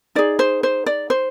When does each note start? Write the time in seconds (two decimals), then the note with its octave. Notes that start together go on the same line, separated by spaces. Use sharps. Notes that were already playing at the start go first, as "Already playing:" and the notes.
0.15 D#4 G#4 D5
0.39 C5
0.63 C5
0.86 D5
1.10 C5